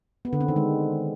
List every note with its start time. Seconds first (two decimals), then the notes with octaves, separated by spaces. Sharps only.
0.25 B3
0.33 D3
0.41 C4
0.48 D#3
0.56 G#3